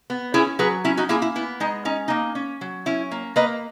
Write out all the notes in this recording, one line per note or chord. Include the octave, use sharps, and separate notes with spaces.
B3
C#4 E4 G#4
F#3 G#4 B4
C#4 E4
D#4 F#4
A#3 E4 G#4
E4
B3 E4
G#3 D#4
C#4 D#4
A#3 D#4
C#4
F#3
C#4 E4
A#3
A#3 B4 D#5